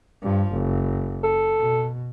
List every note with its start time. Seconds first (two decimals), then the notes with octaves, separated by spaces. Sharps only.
0.22 G2 F3
0.52 F#1
1.23 A4
1.58 B2